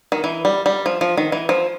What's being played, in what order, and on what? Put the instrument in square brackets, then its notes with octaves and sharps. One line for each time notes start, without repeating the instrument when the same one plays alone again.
[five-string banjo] D#3
E3
G3
G3
F3
F3
D#3
E3
F3